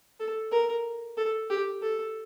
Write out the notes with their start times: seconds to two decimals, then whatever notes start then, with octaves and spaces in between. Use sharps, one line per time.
0.20 A4
0.52 A#4
1.17 A4
1.50 G4
1.82 A4